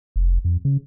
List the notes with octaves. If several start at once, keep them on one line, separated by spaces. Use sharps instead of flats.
F1
F2
C#3